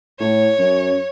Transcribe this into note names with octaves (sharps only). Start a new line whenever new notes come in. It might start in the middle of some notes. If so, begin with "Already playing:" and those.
A2 C#5
F#2